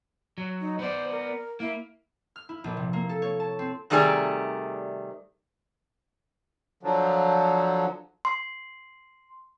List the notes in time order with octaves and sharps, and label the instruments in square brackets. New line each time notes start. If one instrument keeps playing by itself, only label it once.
[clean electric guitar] F#3
[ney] D#4
[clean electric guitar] B3 D5 [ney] C5
[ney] A#4
[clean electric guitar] A#3 [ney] E4
[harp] F6
E4
A#1
C3
A#3
A4
C#5
A5
C4
[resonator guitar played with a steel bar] C3 D#3 G3 A3 G#4 D5
[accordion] D3 F3 F#3
[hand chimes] C6